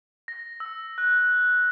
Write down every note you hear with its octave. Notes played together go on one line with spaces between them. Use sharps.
A#6
E6
F#6